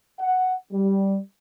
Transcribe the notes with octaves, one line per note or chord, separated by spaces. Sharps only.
F#5
G3